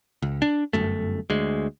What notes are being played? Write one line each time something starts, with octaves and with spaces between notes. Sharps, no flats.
C#2
D4
G1 F#2 A3
D2 G#3